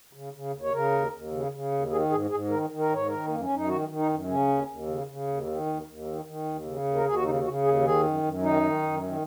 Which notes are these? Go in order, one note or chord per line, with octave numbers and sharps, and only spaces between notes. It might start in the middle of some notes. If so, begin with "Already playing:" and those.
C#3
C#3
D#2
C#5
C#3 A#4
D#2
D#2
C#3
C#3
D#2
D#3 G#4
G#2 G#4
G#2 G#4
D#3 A#4
D#3
A#4
G#2 C#5
D#3 A#4
F#2 A#3
C#4
F#2
D#4
D#3 F#4
D#3
D#4
F#2
C#3 C#4
D#2
D#2
C#3
C#3
D#2
D#3
D#2
D#2
D#3
D#3
D#2
C#3
D#2
A#4
D#2 G#4
F#4
C#3 D#4
C#3 F#4
D#2 G#4
D#3 G#4
F#2
F#2
D#3 D#4
D#3
F#2
D#3